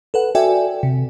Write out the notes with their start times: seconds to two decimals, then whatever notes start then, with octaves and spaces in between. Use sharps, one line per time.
0.14 A4 B4 F#5
0.35 F#4 A4 D5 E5 G5 G#5
0.83 C3